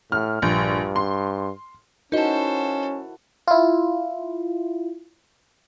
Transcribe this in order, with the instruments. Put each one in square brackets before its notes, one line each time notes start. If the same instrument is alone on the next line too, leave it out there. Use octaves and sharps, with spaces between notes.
[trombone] A2 [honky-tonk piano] F6
[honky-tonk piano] A#1 [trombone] G2
[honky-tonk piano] C6
[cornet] C#4 [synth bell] D#4 D#5 [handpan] E4 F#4 A#4 [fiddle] A4 C5
[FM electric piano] E4 F4